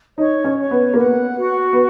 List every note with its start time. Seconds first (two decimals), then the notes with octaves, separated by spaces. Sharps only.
0.18 D#4 C#5
0.45 C#4
0.59 C#5
0.71 B3
0.94 A#3
0.97 B3 F#5
1.38 F#4
1.73 B3